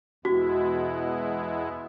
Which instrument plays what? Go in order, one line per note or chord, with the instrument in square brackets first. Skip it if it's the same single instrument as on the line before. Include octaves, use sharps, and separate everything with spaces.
[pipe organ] E2 B2 G#3 B3 E4 [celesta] F#4